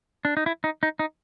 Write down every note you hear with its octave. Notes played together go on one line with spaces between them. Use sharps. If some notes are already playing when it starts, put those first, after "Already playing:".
D4
D#4
E4
D#4
D#4
D#4